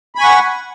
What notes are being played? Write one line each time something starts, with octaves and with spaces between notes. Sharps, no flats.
F#5 G#5 B5 C#6